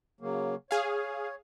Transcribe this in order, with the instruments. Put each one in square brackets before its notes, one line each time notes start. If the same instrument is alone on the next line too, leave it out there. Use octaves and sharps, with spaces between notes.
[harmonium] C#3 F#3 A#3
[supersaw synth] G#4 F5 [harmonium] C#5